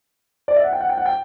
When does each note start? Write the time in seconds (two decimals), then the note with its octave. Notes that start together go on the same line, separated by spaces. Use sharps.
0.48 D5
0.56 E5
0.64 F#5
0.73 G5
0.81 F#5
0.89 G5
0.98 F#5
1.06 G5